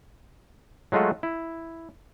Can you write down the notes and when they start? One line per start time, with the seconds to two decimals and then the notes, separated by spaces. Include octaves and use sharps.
0.92 F#3 G#3 A3 F4 F#4
1.23 E4